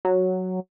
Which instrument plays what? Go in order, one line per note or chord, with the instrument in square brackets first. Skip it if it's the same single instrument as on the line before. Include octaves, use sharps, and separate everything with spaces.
[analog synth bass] F#3